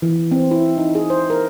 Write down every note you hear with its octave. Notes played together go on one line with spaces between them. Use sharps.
E3
C4
E4
D#4
G#4
C5
A#4